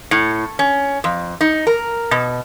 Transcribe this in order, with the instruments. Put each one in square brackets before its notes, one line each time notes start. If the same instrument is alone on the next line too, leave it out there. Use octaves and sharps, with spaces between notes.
[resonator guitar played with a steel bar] A2
C#4
F2
D#4
A#4
B2